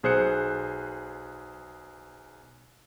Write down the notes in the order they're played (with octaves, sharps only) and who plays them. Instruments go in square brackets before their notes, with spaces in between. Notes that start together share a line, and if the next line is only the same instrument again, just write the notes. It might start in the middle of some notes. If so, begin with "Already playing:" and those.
[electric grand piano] B1 G#4 C5 F#6 C#7